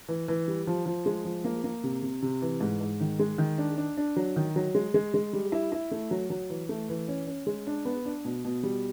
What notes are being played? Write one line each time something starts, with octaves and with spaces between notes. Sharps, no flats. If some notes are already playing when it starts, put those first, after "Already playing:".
E3
E3
G3
F3
F3
G#3
F3
A#3
A#3
C3
C3
C3
E3
G#2
G#2
D#3
G#3
D#3
D4
D4
D4
F#3
D#3
F#3
G#3
G#3
G#3
G3
E4
E4
A3
F#3
F#3
E3
A3
E3
C#4
C#4
G#3
D4
B3
D4
B2
B2
G3